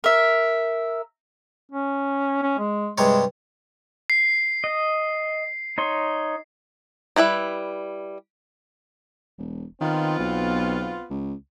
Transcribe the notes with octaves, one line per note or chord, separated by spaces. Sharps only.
A#4 E5
C#4
C#4
G#3
G2 C3 G#3 C#5
C7
D#5
D#4 C#5 C6
G3 E4 B4 E5
E1
D#3 B3 C4 F4
B1
C#2